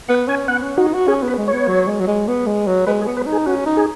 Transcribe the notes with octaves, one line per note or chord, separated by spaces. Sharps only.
B3 F#5
C#4 G#5
B3 F#5
C#4
D#4 F#4
F#4
C#4 G#4
B3
B4
G#3
B3 C#5
F#3
G#3
F#3
G#3
B3
G#3
F#3
G#3 B4
G#4
B3
B4
D#4
G#4
C#4 F#4
D#4
G#4